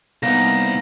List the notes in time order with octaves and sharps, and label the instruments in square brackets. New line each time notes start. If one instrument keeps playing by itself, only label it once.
[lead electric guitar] C2 [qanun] A#3 B3 D#4 [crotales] A#6